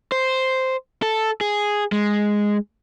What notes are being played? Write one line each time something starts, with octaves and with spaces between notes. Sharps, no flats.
C5
A4
G#4
G#3